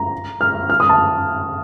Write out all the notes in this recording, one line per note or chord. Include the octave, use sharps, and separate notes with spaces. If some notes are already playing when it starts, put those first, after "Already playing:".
Already playing: A#5
F6
F6
D#6
A5